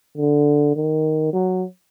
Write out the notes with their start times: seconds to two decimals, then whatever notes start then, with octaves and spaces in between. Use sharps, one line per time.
0.17 D3
0.76 D#3
1.33 F#3